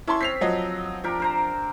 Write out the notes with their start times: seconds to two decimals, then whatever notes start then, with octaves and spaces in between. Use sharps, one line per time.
0.08 C#4 E4 A5 C6
0.21 C4 B6 C7 F7
0.41 F3 F#3 D#5
1.04 F3 D4 G4 A#4
1.20 A#4 C5 A#5